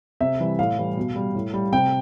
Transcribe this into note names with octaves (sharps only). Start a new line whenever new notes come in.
C3 E5
E3 G3
A2 F5
E3 G3
B2
G3
A2
G3
C3 G5